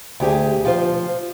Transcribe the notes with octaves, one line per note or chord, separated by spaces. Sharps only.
D2 G4 G#4
F3 F4 C5